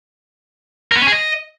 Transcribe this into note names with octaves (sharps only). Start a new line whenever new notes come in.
A#4
B3
C#4
G#4
D#5